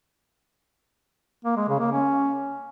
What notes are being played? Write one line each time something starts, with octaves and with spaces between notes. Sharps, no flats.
A#3
G#3
C#3
A#3
C#4